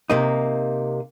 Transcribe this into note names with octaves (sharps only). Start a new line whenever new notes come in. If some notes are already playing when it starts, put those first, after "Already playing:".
C3 A#3 D#4